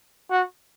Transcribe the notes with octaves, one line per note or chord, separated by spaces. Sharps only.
F#4